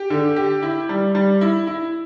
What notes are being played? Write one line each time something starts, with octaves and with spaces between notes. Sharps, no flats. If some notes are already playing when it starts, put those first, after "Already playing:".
Already playing: G4
D3
G4
E4
G3
G3
E4
E4